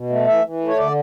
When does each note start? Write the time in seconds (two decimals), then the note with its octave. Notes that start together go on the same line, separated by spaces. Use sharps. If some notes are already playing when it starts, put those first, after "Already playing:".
Already playing: B2
0.10 A3
0.27 E3 E5
0.44 E3
0.60 A3
0.68 C#5
0.78 D3 D5